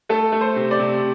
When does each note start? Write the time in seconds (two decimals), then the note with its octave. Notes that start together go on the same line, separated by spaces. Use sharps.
0.09 A3 A4
0.32 A3
0.41 C5
0.56 C3
0.71 D5
0.79 C3